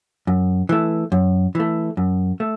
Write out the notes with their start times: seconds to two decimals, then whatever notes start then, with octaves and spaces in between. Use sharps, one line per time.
0.27 F#2
0.69 E3 A3
1.12 F#2
1.55 E3 A3
1.97 F#2
2.40 A3